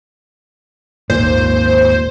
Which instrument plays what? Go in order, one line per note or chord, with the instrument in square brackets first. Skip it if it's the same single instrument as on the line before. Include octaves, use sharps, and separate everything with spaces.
[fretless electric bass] G#1 D#2 A#2 [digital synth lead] C5